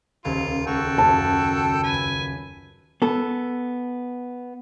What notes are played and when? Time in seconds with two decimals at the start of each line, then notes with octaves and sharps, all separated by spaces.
0.25 D#1 C#2 F4
0.67 G#3 F#4 A4 G5
0.98 F#2 C#3 F#3 A5
1.84 B4 G#5
3.02 B3 A4